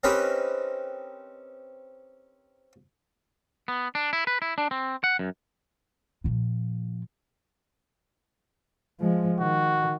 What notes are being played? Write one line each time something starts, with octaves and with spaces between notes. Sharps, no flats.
C4 C#4 D#4 G4 A#4 B4
B3
D4
E4
B4
E4
D4
C4
F#5
F#2
A#2 F3
F3 G#3
D#3 F#4